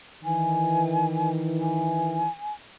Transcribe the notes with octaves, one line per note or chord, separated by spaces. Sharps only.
D#3 E3 G#5
G#5